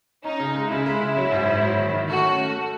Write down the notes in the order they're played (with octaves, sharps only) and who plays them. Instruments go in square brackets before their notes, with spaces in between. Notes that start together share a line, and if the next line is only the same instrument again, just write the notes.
[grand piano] C#4 [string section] D#4
[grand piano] C#3
G#3
[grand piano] C#3 [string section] E4
[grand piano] G#3
C#3
F#3
G#2
G#2
F#3
D#3
D#3
[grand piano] A3 [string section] F#4
[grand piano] C#4
A3
A3